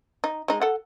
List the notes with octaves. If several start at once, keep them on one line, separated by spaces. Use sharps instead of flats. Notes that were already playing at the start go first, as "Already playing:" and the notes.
D#4
G#3 D#4
A4 F#5